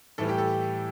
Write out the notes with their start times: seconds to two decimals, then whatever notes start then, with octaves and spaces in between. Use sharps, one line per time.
0.18 A2 E3 G3 A4
0.29 G4
0.38 A4